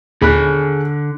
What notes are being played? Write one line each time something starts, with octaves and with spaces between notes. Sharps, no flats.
D#2 A#2 D3 G#4 B5 F#6